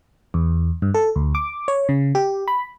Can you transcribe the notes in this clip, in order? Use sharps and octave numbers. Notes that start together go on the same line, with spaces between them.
E2
G2
A4
D2
D6
C#5
C#3
G4
B5